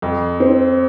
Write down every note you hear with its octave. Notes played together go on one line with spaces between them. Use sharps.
F2
C4